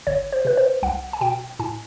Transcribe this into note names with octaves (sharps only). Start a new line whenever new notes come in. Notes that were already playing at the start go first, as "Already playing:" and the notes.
G1 C#5
C5
C3 B4
C5
C2 F#5
G#5
B2 G5
A2 G#5